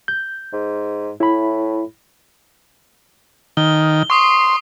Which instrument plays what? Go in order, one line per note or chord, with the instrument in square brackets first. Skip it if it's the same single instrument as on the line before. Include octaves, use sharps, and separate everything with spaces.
[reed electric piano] G6
[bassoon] G#2
[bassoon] A2 [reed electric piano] E4 B5
[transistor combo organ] D#3 [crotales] G7
[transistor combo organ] C6 [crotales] C#6 D#6 C7